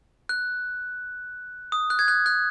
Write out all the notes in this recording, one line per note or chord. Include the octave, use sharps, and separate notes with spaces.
F#6
D#6
F#6
G#6
F#6
F#6